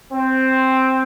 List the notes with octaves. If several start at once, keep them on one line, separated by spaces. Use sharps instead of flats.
C4